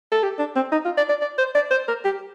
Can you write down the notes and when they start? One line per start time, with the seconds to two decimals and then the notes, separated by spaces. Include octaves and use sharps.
0.12 A4
0.23 G4
0.39 D4
0.56 C4
0.72 D#4
0.85 F4
0.97 D5
1.09 D5
1.22 D5
1.38 C5
1.55 D5
1.71 C5
1.88 A#4
2.04 G4